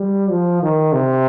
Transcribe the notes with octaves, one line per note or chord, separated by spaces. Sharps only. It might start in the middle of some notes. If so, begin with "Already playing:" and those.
Already playing: G3
F3
D#3
C3